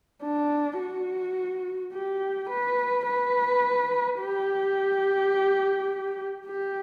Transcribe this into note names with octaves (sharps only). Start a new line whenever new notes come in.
D4
F#4
G4
B4
B4
G4
G4